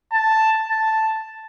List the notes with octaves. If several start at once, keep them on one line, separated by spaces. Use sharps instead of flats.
A5
A5